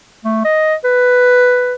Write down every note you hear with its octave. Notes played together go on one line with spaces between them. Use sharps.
A3
D#5
B4